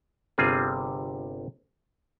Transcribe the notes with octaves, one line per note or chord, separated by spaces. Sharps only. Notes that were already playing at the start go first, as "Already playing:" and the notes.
G1 C3 G3 C4 F4 G#4